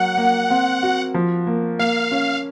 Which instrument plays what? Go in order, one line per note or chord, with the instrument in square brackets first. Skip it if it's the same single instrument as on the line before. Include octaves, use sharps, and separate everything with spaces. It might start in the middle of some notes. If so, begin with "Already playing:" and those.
Already playing: [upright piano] F#3 A#3 [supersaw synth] F#5
[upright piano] A#3
C4
F#4
F3
A#3
[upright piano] A#3 [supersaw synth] F5
[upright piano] C#4